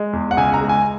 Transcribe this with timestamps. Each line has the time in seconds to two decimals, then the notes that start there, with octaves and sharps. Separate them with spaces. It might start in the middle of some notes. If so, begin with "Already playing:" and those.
Already playing: G#3
0.13 E2
0.31 F#5
0.37 C#2 G#5
0.54 A#5
0.61 G#3
0.69 G#5